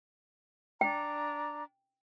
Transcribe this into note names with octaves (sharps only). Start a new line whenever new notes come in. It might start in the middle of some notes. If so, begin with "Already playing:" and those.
D4 G5 A#5